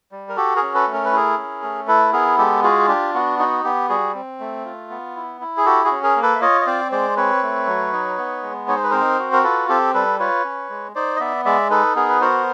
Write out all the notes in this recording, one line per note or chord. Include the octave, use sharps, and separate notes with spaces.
G3
A#4
F#4 G4 A4
G#4 A#4
C#4
A4 B4
A3
A#4
B4
E4 G#4 A#4
C#4
A3
E4 A4 B4
B3 G#4 A#4
G#3 G4 A4
F4 F#4 G#4
D4 G4
B3 F#4
D#4 F#4
B3 G4
G3 F#4 G#4
C4
A3
F4
B3
E4
E4
G#4
F#4 G4 A4
F#4 G#4
C#4
G#4 A#4
A#3
A4 B4
E5
F4 C#5 D#5
D#5
C4 C5 D5
G#3 C5 D5
C4 B4 C#5
A3
F#3
D#4
B3
G#3
D#4 C#5
C5
B4
C4 A#4 C5
F#4
A#4
F4 A4 B4
C4 G4 A4
G3 A4 B4
F4 B4 C#5
C#4
G#3
D#4 C5 D5
D#5
B3 D5 E5
G#3 D5 E5
D#4 A4 B4
B3 G#4 A#4
B4
F#4 A#4 C5